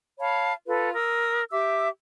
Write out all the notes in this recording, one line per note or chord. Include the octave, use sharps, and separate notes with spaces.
C#5 F5 A5 B5
F4 A4 B4
A#4 D#6 E6
G4 E5 D6 E6